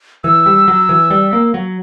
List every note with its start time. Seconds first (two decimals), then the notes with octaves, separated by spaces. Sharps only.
0.24 E3 E6
0.46 G3
0.68 F#3
0.89 E3
1.10 G3
1.33 A#3
1.54 F#3